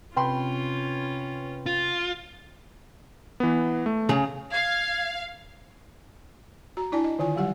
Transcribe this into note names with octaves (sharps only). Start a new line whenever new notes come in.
C3 C#4 F4 B4 G5 B5 C6
F4
E3 B3
A3
C#3 G#4 A#5
F5 G#6
F#4 A#5
D4 E4 D5 G#5 A5
D#5
D3 D#3 F4 G#5
F#3 G3 G4 F#5